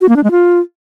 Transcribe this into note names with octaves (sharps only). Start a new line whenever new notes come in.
F#4
A#3
D4
G#3
F4